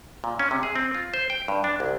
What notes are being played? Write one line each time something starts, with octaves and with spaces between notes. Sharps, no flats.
A#2
C#4
C3
G#4
C4
F4
C5
G5
G2
D4
C2